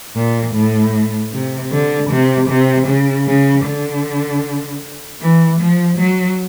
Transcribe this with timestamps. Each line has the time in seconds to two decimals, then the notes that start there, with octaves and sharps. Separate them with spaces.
0.15 A#2
0.55 A2
1.32 C3
1.72 D3
2.10 C3
2.49 C3
2.87 C#3
3.27 C#3
3.65 D3
5.21 E3
5.60 F3
5.99 F#3